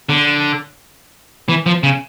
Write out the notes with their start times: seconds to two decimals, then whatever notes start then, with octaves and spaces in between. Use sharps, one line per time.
0.09 D3
1.49 E3
1.66 F3
1.83 C#3